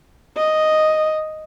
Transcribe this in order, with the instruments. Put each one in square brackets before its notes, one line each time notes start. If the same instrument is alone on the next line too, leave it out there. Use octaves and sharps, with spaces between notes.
[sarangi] D#5